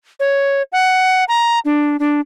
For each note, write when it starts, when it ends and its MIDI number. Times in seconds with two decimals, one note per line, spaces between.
0.20 0.62 73
0.72 1.24 78
1.28 1.59 82
1.65 1.97 62
1.99 2.21 62